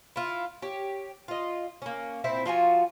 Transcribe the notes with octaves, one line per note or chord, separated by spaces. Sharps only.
E4 F4
G4 C#5
F4 D#5
A#3 C#4
A#2 C4 E4 C5
F3 F4 F#4 G#5